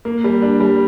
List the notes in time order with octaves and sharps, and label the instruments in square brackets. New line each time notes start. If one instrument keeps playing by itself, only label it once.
[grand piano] A#3
G3
D4
G3